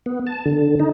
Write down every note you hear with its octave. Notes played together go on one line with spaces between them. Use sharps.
B3
A5
D3
D#4